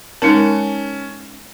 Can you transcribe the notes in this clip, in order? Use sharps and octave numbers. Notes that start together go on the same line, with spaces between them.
G#3 C#4 D#4 A#4 A5